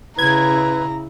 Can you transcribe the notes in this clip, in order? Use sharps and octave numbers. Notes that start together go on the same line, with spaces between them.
C#3 E4 B4 A#5 G#6